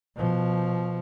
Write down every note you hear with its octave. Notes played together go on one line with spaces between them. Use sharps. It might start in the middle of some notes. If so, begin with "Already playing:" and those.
B2 F3